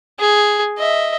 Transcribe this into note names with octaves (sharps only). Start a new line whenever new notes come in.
G#4
D#5 E5